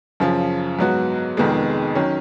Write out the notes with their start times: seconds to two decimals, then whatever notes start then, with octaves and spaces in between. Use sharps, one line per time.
0.20 F#2 C#3 F3
0.79 G#2 F#3 B3 F#4
1.37 F1 F2 D#3 G#3 B3
1.95 D#3 F#3 C#4